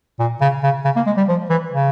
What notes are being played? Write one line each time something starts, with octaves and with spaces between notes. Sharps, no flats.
A#2
C#3
C#3
C#3
A#3
G#3
G3
F3
E3
C#3